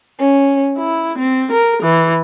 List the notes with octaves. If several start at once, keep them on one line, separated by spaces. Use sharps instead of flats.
C#4
E4
C4
A#4
E3